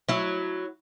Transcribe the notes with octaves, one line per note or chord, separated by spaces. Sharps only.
F#3 E4